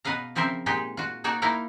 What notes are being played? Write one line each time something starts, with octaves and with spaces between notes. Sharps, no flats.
B2 B4 D#5 F5 A#5
C#3 F3 C4 A#4 C5 E5
A#2 G#3 D#4 G4 G#4
F4 F#4
A#3 D#4 F#4 C#5 D5 A5
A#3 D#4 E4 A#4 F5 G5